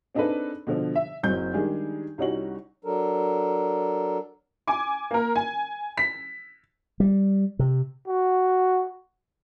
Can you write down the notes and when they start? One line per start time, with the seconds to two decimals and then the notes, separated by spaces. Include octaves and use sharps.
0.15 C4 D4 D#4 G#4 A4 B4
0.67 B2 D3 F3
0.95 E5
1.23 F#1 F#3 C4 G6
1.54 D#3 G3 G#3 D4 G#4
2.18 C2 G3 C#4 D#4 F#4 F#7
2.85 F#3 D4 A4 A#4
4.67 G#5 D6
5.11 A#3 A#4
5.36 G#5
5.97 B6
7.00 G3
7.59 C3
8.08 F#4